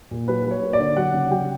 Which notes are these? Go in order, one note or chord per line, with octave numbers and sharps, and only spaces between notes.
A#2
F#3 B4
F#3
C#5
A#3
D5
D3
F#3 F#5
C#3
F#3 G5